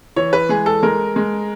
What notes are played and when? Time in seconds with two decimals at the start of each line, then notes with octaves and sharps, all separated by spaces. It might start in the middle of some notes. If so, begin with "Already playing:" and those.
0.16 E3 C#5
0.33 B4
0.49 G#3 G#4
0.66 A4
0.83 G#3 A#4
1.16 G#3